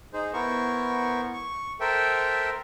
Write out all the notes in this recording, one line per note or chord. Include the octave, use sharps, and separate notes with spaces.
D#4 G#4 C5
B3 E4 A#4 C5 C#6
C#6
A4 A#4 C5 E5 G5